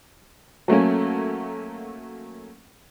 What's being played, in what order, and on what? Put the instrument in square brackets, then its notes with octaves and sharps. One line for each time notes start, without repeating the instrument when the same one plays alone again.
[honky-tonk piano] F#3 A3 A#3 C#4